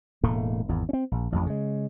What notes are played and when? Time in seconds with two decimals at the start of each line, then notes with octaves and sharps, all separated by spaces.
0.23 E1 A2 A3 A#3
0.69 G#1 E2
0.89 C4 C#4
1.12 A#1
1.32 A1 F2
1.47 C#3 G#3